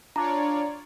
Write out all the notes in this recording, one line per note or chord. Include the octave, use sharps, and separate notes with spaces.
D4 F4 C#5 D5 A#5